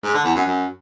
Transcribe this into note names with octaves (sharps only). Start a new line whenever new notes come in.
G#2
D3
E2
F#2
F#2